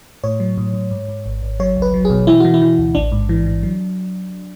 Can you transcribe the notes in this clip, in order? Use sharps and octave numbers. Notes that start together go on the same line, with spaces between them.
A2 C#5
F#3
A2
A2
G#2
G#2
G#1
G#1
F#3 C#5
C#2
B4
F#3
G#4
B2
E3 E4
E3 F#4
E4
E3
D2
A1 D4
G#2
E3
E3
F#3